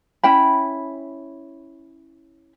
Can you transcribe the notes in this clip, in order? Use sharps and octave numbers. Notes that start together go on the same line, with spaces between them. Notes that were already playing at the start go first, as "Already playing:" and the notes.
C#4 E4 G5 B5